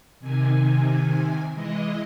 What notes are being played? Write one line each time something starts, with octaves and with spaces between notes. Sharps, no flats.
C3 D#3 G#5
E3 G#3 D#5